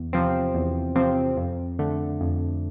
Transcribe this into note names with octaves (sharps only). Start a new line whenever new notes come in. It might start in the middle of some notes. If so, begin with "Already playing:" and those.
Already playing: E2
C3 F3 C4
E2
C3 F3 C4
F2
D3 A3
F2